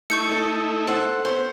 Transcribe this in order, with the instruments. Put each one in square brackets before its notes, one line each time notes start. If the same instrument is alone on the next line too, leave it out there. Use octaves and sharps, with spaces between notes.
[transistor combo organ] A3 D#4 E4 [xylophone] C#6 G6 C#7
[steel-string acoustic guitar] A4 D#5
A4 C5 F#5
B3 C#4 C5